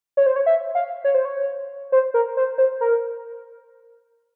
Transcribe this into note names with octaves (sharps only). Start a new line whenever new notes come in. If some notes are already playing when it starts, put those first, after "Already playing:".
C#5
C5
C#5
E5
F5
C#5
C5
C#5
C5
A#4
C5
C5
A#4